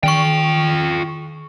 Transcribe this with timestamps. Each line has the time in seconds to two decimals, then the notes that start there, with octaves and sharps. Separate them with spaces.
0.03 D#3 F4 G5 C#6